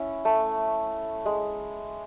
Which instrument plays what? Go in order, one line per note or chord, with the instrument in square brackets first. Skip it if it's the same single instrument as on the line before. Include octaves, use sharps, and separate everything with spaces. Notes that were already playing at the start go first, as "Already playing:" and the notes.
Already playing: [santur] C#4 E4
A3
G#3